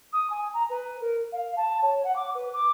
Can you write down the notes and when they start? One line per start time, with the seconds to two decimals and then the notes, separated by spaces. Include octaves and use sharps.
0.12 D#6
0.29 G#5
0.53 A#5
0.69 B4
1.01 A#4
1.32 F5
1.56 A5
1.81 C#5
2.04 F#5
2.15 D6
2.34 B4
2.53 D6